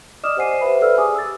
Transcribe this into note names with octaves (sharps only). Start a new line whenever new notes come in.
D5 D#5 D6 D#6 F6 E7
G4 C5 F#5 G#5 C7 D#7
B4 C5 E5 B5
A4 B4 D5 E5 E6 F6
G4 G#4 G#5 D6 D#6
E6 A6